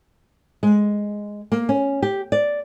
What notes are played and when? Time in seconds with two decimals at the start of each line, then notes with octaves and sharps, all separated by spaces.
0.63 G#3
1.52 A#3
1.69 C#4
2.02 G4
2.32 D5